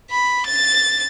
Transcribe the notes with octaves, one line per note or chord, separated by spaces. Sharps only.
B5
A6